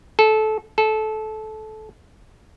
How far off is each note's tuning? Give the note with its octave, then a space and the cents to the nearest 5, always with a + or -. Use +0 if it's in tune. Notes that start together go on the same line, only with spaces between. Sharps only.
A4 -20
A4 -20